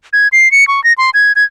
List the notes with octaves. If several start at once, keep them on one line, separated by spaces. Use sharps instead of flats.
G#6
C7
C#7
C#6
A#6
C6
G#6
G#6